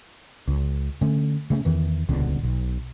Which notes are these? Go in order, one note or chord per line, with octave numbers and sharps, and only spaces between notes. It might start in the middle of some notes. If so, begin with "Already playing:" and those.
C#2
D3 A3 C#4
C#3 A3 B3 C#4
E2 D#3 E3
D#1 C#2 B2 D3
B1